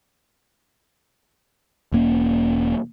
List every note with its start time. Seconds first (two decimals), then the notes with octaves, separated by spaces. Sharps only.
1.92 E1 A#3 C#4